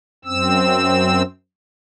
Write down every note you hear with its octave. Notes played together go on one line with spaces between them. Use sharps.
F#2 C4 E6